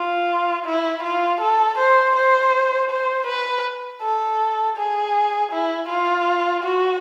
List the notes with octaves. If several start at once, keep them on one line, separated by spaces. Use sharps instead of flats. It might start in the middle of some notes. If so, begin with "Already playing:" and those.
Already playing: F4
E4
F4
A4
C5
C5
C5
B4
A4
G#4
E4
F4
F#4